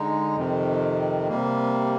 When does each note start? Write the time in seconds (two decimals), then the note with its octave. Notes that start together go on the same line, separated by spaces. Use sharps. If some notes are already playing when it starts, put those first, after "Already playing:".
Already playing: D3 G#3 D#4
0.37 F2 C3 D#3
1.29 C3 G3 A#3